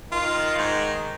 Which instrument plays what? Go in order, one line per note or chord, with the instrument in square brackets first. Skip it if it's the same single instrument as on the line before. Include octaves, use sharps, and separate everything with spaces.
[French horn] D#3 [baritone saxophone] F4
[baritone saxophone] G#2